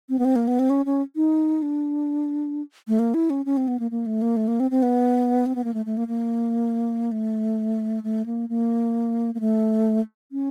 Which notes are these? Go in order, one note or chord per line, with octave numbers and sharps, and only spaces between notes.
C4
B3
C4
A#3
B3
C4
C#4
C#4
D#4
D4
A3
A#3
E4
C#4
C#4
C4
B3
A#3
A#3
A3
A#3
A3
A#3
C4
C4
B3
C4
B3
A#3
A3
A3
A#3
A#3
A3
A3
A#3
A#3
A#3
A3
C#4